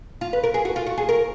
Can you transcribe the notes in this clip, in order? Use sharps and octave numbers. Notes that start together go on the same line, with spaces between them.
F4
B4
A#4
G#4
F#4
F4
F#4
G#4
A#4